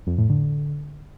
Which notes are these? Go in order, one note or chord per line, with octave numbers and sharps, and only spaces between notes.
F2
A2
D3